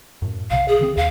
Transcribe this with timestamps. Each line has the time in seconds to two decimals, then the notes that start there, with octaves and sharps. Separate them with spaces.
0.22 F#2 A2
0.51 B1 C3 F5
0.68 G#4
0.81 D#3 C4
0.97 D#2 F5